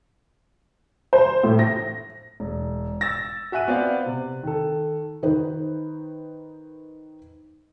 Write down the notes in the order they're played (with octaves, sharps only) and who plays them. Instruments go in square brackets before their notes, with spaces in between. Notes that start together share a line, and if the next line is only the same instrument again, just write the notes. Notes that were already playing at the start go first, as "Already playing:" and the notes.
[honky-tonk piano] C5
A2
A#6
[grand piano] E1
E6 A6 A#6
F#4 E5 G#5 F#6 D#7
B3 C4 C5 D5 F5
C3
D#3 A4
[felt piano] D#3 D#4 B4 C5